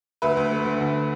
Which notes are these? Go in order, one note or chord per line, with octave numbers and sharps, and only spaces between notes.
D2 B4 E5
D2
A3
D3
D2